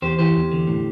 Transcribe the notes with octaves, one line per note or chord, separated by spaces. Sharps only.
E2 G4 C5
E3 G4 C5
E2
D3
A2